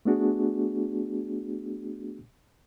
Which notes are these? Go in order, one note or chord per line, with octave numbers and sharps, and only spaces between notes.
A3 B3 D4 F#4 G#4